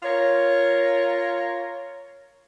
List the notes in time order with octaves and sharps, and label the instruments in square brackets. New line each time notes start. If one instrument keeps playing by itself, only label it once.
[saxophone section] F4 A#4 C#5